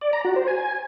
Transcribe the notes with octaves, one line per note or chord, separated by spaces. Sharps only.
D5
A#5
F#4
C5
G#5